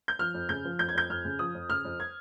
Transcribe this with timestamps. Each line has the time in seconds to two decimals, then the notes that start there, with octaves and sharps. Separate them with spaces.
0.08 G6
0.19 F3 F6
0.34 F2
0.49 C#3 G6
0.65 F3
0.79 F2 G6
0.89 G#6
0.94 F2 G6
1.10 F2 F6
1.25 C#3
1.39 F3 D#6
1.54 F2
1.70 C#3 F6
1.85 F2
2.00 G#6